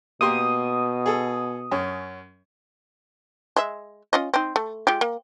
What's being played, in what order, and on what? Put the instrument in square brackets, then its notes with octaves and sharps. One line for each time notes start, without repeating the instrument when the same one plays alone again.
[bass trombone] B2 [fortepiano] A#3 G4 C6 [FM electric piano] D#6
[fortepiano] G#4 A4
F#2 C#4
[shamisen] G#3 E5
C#4 F4 D#5
C4 D#4
A3
G#3 F4 G4
A#3